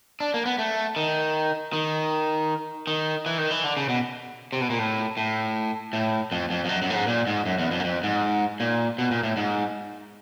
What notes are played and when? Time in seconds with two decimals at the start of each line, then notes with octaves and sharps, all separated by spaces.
0.20 D4
0.34 A#3
0.46 B3
0.58 A3
0.96 D#3
1.73 D#3
2.87 D#3
3.26 E3
3.38 D#3
3.51 E3
3.64 D3
3.77 C#3
3.89 B2
4.53 C3
4.61 B2
4.70 A#2
4.78 A2
5.17 A2
5.93 A2
6.32 F2
6.50 F2
6.65 F2
6.69 F#2
6.82 F#2
6.90 A2
6.95 G#2
7.08 A#2
7.27 G#2
7.46 F#2
7.59 E2
7.71 F2
7.80 F#2
7.84 F2
8.03 G#2
8.60 A#2
8.98 B2
9.11 A#2
9.24 A2
9.37 G#2